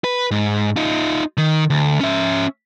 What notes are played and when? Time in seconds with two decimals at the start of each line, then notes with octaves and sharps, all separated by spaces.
0.04 B4
0.31 G#2
0.76 D#4 F4
1.38 D#3
1.70 D2
2.01 C#4 E5